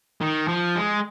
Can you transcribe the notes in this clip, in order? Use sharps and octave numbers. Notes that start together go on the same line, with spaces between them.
D#3
F3
G#3